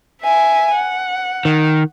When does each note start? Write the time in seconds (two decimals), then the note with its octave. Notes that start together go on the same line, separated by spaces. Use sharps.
0.22 E5 G#5
0.75 F#5
1.45 D#3